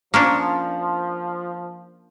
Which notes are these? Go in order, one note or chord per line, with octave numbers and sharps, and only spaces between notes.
F3 A#3 C#4 D4